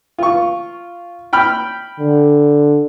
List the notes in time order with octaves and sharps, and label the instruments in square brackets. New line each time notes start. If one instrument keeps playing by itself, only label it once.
[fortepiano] F4 C#6
G5 B5 F6
[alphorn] D3